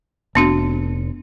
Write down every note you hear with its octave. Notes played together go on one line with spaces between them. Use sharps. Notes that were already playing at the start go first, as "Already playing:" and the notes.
F1 B3 D4 F#4